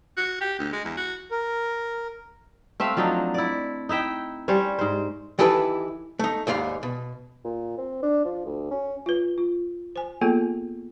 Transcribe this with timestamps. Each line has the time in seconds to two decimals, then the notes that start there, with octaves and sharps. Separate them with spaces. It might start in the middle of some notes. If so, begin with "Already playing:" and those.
0.17 F#4
0.41 G4
0.59 D2
0.73 G#3
0.84 E2
0.97 F#4
1.30 A#4
2.80 A3 C4 E5 F5
2.97 F3 F#3 D4 D#4
3.34 E4 D5
3.89 D#4 E4 E5 G5
4.48 G3 C#4 C5 C#5
4.79 G#2 C5
5.39 D#3 E3 E4 G4 A4 B4
6.19 A3 D#4
6.47 D#2 G#2 G3 F5
6.83 B2
7.44 A#2
7.78 C4
8.03 D4
8.25 F3
8.46 D2
8.71 C#4
9.06 F4 B4
9.38 F4
9.96 C5 G#5
10.21 A#3 B3 F4 G#4 A4